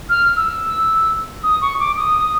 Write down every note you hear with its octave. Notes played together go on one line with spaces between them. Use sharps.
F6
E6
D#6
C#6
D6
D#6